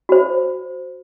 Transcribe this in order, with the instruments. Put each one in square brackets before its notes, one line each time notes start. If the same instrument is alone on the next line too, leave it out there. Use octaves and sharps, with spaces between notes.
[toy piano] F#4 C5